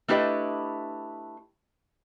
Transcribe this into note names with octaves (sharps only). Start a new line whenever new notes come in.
A3 D4 E4 G4 B4 D#5